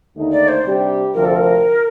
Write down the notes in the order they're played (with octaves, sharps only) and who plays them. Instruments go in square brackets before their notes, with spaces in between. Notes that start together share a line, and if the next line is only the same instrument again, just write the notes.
[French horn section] D#2 D3 A3 D#4
[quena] D5
C5
[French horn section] C3 G3 D4 G4
[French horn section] D2 C3 F3 [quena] A#4
[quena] A4
A#4